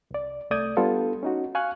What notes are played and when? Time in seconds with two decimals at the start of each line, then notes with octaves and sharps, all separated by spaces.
0.11 C2 D5
0.51 C2 A3 D5 D#6 G6 G#6
0.77 G3 B3 D4 F4 A4
1.23 C#4 D#4 F#4
1.55 F5 G#5 C#6 F6 F#6